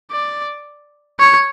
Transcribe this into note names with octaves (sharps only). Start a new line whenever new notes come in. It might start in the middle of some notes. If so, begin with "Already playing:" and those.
D5
C#5